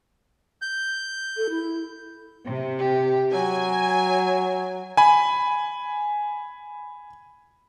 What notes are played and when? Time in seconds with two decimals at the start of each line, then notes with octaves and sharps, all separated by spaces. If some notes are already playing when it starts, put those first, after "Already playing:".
0.62 G6
1.37 A4
1.50 E4
2.47 C3
2.79 G4
3.32 F#3 G#5
4.97 G#5 B5